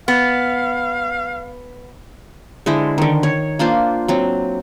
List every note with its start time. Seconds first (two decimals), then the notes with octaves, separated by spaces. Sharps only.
0.08 B3 F5
2.66 D3 G#3 E4 C5
2.98 D3 D#3
3.23 C#5
3.59 A#3 D4 F4 C5
4.08 F#3 C4